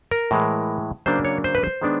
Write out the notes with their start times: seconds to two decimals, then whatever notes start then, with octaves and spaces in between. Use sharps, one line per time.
0.11 A#4
0.31 A2 E3 G#3
1.06 C#3 F#3 A#3 D4 C5
1.25 C#5
1.44 C5
1.55 B4
1.64 C5
1.82 D#3 G#3 B3 D4